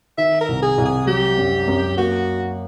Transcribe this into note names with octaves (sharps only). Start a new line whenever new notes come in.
D#3 E5
A#4
C2
G#4
C2
G#4
F#3 G4
F#2
F#2
A#3 F#4